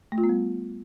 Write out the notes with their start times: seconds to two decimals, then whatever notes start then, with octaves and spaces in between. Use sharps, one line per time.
0.12 A3
0.18 F4
0.24 B3
0.29 G3